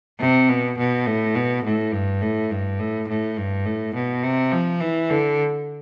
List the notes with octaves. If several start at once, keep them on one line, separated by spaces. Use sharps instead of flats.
C3
B2
B2
A2
B2
A2
G2
A2
G2
A2
A2
G2
A2
B2
C3
F3
E3
D3